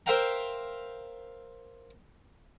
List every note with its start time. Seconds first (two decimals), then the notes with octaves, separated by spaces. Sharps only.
0.06 A#4 C5 E5 F5 G5 A#5